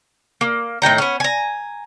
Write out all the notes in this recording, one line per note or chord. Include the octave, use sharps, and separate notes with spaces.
A#3
A2 D#3 G5 A#5
B3 C#4
G#5 A#5